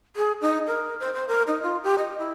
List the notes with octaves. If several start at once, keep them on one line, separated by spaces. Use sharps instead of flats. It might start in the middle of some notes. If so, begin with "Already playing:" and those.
G#4
D#4
A#4
C5
C5
A#4
D#4
F4
G4
D#5
E4